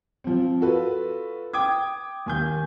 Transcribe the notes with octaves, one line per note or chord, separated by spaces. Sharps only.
F3 C4
F4 F#4 A4 B4
G5 D6 D#6 G#6
D#2 G#5 G6